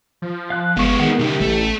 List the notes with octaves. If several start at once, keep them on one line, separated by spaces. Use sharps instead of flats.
F3
F5 F#6
G1 G#3 B3 F5 C#6
D#3 G#4 F#5
C2 D3 E4 G4
A1 A3 A4